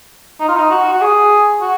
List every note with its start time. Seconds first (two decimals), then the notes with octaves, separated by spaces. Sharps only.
0.40 D#4
0.48 F4
0.57 D#4
0.71 F#4
0.93 F#4
1.01 G#4
1.61 F#4